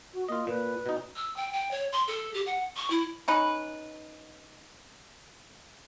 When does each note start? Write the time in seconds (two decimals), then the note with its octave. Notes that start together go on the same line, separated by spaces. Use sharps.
0.14 F#4
0.29 A#3 F4 D#5
0.47 A#2 B4
0.86 B2 D#4
1.16 E6
1.37 G5
1.53 G5
1.71 C#5
1.92 C6
2.08 A4
2.34 G4
2.46 F#5
2.76 C#6
2.90 E4
3.28 C#4 D#4 B4